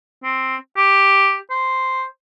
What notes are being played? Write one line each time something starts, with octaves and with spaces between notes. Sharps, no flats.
C4
G4
C5